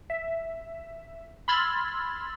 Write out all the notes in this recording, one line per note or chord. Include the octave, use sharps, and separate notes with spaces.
E5
B5 C6 E6 F6 G#6 A6